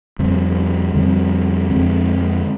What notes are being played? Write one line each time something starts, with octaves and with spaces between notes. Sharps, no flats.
F2 D3 G3 C4
F2 D3 G3 C4
F2 D3 G#3 C4